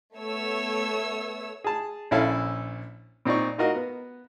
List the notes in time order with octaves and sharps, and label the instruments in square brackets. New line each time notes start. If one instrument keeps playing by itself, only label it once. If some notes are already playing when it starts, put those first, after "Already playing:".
[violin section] A3 B3 C#5 E6
[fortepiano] G#4 A5
A#1 C#4 E4 A4 F5
A#2 C4 D#4 D5 C#6
D#4 F4 F#4 A#4 D#5 F5
B3